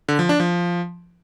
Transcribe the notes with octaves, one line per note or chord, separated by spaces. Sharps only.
D3
F3
D4
F3